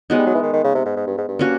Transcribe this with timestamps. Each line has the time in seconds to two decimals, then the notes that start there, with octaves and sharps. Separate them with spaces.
0.10 F#3 G#3 B3 D#4
0.18 G3
0.26 F#3
0.35 E3
0.42 D#3
0.53 D#3
0.64 C#3
0.75 C3
0.85 G#2
0.96 G#2
1.07 G2
1.18 G#2
1.29 G2
1.39 A#3 C#4 F#4